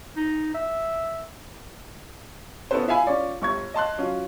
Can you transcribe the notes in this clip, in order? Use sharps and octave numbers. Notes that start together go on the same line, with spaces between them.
D#4
E5
B3 C#4 E4 A4 B4 C5
E4 F4 E5 F5 G#5 B5
C#4 F4 C#5 D5
G1 C#6 G#6
D#5 A5 C6 F#6
F#3 C#4 F4